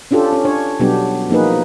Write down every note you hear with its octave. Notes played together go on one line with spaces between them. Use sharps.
C#4 D4 F4 G4 A4
C#4
D4 C#5
B2 F#3 G3 B3 D4 G4
F3 A#3 D#4 G#4 B4